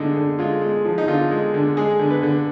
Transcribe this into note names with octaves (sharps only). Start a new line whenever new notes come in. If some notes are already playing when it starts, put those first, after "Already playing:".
Already playing: D3 G#3 D#4
D3
G#3 F4
G#3
F3
D#4
D3 F4
G#3
D3
G#3 G#4
D3
B4
D3